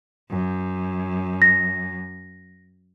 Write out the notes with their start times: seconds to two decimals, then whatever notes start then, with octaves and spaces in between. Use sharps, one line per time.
0.30 F#2
1.42 A#6